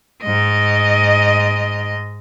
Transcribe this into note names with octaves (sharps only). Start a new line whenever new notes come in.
G#2 D#5